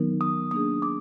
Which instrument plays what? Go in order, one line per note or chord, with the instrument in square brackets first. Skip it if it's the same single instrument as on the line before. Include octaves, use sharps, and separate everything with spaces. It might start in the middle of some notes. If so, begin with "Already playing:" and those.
Already playing: [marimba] D#3 F#3 B3 D#4 A#4
[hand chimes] D#6
[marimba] A#3 D4 G#4 [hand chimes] D#6
[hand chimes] D6